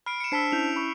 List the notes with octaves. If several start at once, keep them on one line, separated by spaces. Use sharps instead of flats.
B5 F6 C7 D7
C#7 E7
D4 C5 A5 E6 B6 C7
C#4 E4 G6 F7
B5 C#6